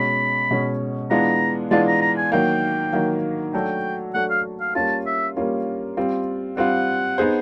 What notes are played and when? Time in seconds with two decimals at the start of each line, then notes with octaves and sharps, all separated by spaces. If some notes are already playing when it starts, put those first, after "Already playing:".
Already playing: B2 G#3 C#4 B5
0.51 B2 G#3 C#4
1.10 E3 G#3 B3 D4 F4 A#5
1.71 E3 G#3 B3 D4 F4 A5
1.87 A#5
2.01 A#5
2.18 G#5
2.32 D#3 F#3 A#3 G5
2.93 D#3 F#3 A#3
3.53 F#3 A3 D4 F#4 A4 G5
4.14 F#3 A3 D4 F#4 A4 F#5
4.30 F5
4.60 F5
4.75 G3 A#3 C#4 F4 A5
5.06 E5
5.36 G3 A#3 C#4 F4
5.97 G3 C4 F4
6.57 G3 C4 F4 F#5
7.18 B3 D#4 G#4 C5